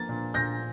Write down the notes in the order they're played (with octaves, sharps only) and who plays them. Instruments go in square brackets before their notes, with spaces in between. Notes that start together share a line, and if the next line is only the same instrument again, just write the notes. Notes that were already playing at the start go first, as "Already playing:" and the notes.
Already playing: [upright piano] F3 A#3 [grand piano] A6
[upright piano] A#2
[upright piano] A#2 [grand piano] G6 A#6